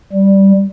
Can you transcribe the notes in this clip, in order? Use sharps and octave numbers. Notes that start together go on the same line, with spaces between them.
G3